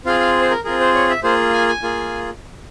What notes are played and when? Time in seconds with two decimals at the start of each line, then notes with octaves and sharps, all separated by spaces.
0.05 C4 F4 G#4 F5
0.20 F5
0.41 C5
0.50 A#4
0.64 C4 F4 G#4 A#4
0.80 C5
0.95 C#5
1.10 E5
1.23 A#3 F4 G#4 C5
1.53 G#5
1.68 G#5
1.83 A#3 F4 G#4